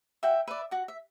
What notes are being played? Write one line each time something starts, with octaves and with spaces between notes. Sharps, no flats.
F#4 E5 G5
B4 D5 E5
F#4 F#5
E5